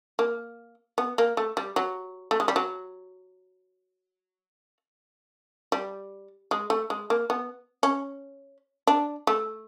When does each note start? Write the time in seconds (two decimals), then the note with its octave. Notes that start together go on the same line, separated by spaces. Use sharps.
0.19 A#3
0.98 B3
1.18 A#3
1.37 A3
1.57 G3
1.76 F#3
2.31 A3
2.40 G#3
2.48 G3
2.56 F#3
5.72 G3
6.51 G#3
6.70 A3
6.90 G#3
7.10 A#3
7.30 B3
7.83 C#4
8.87 D4
9.27 A3